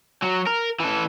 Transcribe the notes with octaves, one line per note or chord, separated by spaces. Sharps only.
F#3
A#4
E3 A4